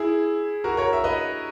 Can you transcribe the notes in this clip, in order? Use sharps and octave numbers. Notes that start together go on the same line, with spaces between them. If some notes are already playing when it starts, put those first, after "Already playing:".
Already playing: E4 G#4
F#4 A#4
A#4 C#5
E5
B4 D#5